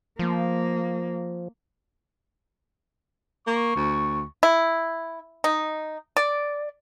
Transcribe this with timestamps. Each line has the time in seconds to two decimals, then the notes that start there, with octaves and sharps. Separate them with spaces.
0.19 F3 A#3
3.47 A#3 C#6
3.76 D2
4.43 E4
5.44 D#4
6.17 D5